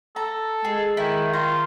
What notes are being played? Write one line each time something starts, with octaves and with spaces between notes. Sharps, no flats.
A4 A#5
G#3 G#4
D#3 E4
F4 A#5